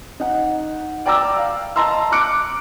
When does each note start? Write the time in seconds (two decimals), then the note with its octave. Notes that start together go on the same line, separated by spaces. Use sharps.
0.20 D#4 F#5
1.06 D5 G5 A#5 D6 E6
1.37 F5
1.76 D#5 A5 A#5 C6 E6
2.12 D6 F#6 C#7 D7